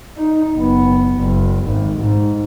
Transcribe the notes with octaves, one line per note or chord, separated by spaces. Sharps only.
D#4
F#1 B3
F#1
G#1
G#2